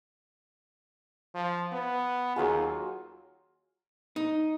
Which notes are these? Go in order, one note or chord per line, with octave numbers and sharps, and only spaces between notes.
F3
B3
D#2 F#3 F4 G#4
D#4